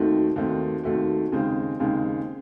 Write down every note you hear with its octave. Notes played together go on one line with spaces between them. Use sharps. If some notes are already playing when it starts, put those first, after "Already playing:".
Already playing: D#2 D#3 A3 C4 F#4
D#2 D#3 A3 C4 F#4
D#2 D#3 A3 C4 F#4
D#2 C#3 G#3 C4
D#2 C#3 G#3 C4